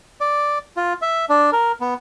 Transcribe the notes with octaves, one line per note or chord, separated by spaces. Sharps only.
D5
F4
E5
D4
A#4
B3